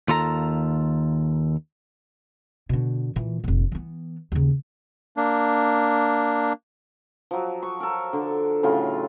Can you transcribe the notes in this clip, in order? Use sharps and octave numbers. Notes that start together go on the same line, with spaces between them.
D#2 F4 A4 A#5
B2 D3
A#2 E3
F1 A#2
E3 B3
D#2 C#3
A#3 D4
F3 F#3
C#6
A4 A#4
D3
A2 C#3 F#3 F4